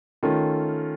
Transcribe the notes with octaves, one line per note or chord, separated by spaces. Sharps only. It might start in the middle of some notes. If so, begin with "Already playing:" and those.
D#3 A3 C#4 F4 A4